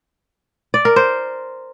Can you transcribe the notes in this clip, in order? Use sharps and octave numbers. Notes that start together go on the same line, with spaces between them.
D5
A#4
C5